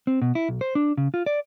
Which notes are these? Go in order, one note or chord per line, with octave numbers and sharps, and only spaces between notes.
C4
B2
E4
B1
C5
D4
C#3
F4
D5